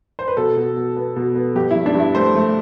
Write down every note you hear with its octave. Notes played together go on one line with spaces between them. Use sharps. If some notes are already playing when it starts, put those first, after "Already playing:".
C5
B4
B2 A4
B2
B2
B3
B2
B3
G2 G4
E4
G2
D4
G2
E4
A3 C5
A3